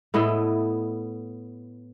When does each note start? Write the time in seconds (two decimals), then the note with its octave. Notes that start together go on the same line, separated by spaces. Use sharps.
0.14 A2 B3 E4 D#5